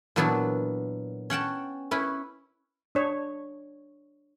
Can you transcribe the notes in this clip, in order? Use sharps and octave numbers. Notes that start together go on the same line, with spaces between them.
A#2 E3 F#3 B3 D4 E4
C#4 F#5 G5 A5
C#4 E4 B4
D4 C#5